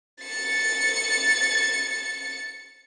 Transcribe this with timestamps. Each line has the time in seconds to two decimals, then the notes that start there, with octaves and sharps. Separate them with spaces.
0.24 A6 C#7